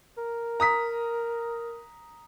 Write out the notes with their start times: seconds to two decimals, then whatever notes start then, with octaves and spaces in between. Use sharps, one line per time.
0.18 A#4
0.60 A#5 D#6 B6